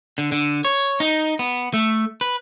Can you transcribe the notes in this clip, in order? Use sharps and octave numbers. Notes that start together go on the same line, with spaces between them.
D3
D3
C#5
D#4
B3
A3
B4